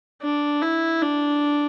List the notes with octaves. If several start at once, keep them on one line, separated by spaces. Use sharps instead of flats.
D4
E4
D4